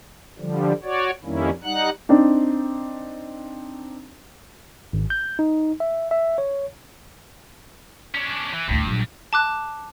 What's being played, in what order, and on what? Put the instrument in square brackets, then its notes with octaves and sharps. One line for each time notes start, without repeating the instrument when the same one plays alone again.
[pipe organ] D3 F3 G3
F#4 C#5 D5
F2 D#3 G3 A#3 C#4 E4
G3 D#4 F#5 F#6
[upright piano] C4 D4 D#4
[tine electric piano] G#1
G6
D#4
E5
E5
C#5
[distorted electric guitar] C#4 D4
E3
[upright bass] A1 D2 [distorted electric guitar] G2
[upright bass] A#1 F#3
[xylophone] A5 D6 F#6